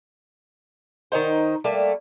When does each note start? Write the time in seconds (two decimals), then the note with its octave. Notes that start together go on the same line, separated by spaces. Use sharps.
1.12 D#3 E3 D#4 C5
1.64 G3 A3 A#3